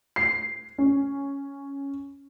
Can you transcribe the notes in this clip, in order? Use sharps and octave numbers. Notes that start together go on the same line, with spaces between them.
C7
C#4